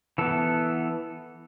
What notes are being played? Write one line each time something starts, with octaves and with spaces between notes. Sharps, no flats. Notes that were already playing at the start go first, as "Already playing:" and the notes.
E3 B3 A4